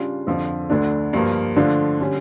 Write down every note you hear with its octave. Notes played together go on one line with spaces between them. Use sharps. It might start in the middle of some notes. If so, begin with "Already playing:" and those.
Already playing: C#3 G3 D4 F4
F2 D3 F3
D2 D3 A3 D4
G2 F3 A#3
D3 F3 A3 D4 F4
D3 G3 C#4